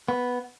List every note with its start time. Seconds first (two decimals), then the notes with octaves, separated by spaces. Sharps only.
0.08 B3